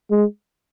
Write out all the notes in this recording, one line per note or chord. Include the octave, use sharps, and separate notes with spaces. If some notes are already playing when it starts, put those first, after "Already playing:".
G#3